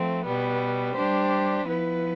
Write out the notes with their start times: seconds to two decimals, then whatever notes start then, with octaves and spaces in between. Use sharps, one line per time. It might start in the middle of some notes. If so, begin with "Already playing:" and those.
Already playing: F3 A3 C4
0.25 B2 G3 B3
0.96 G3 D4 G4 C5
1.67 F3 B3 E4 B4